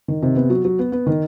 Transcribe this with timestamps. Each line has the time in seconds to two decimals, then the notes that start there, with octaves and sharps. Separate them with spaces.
0.08 D#3
0.22 C3
0.36 B3
0.50 F#3
0.65 F#3
0.79 B3
0.92 B3
1.07 D#3